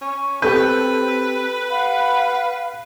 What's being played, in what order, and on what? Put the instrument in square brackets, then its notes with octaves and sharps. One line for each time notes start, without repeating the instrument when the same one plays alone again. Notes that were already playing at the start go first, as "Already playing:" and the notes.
[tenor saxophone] C#4 [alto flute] C#6
[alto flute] C4 [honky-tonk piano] G4 A4 G6 [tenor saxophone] B4
[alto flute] F5 [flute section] F#5 B5